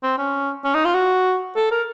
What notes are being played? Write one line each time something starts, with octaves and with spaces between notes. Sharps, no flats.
C4
C#4
C#4
D#4
F4
F#4
A4
A#4